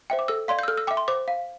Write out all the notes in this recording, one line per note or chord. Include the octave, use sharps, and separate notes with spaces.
C5 E5 G5
D6
A4 E6
D5 F5 C6
G6
E6
A4 F6
E6
E5 G5 D6
C6
C5 D6
F5